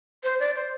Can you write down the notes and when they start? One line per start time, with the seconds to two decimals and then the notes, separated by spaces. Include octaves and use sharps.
0.24 C5
0.40 D5
0.56 C5